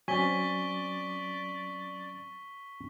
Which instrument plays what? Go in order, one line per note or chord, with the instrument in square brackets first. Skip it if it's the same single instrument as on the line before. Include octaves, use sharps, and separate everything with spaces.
[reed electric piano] F#3 C4 C#4 [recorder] D5 [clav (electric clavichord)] G#5 [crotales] C#6 B6 G7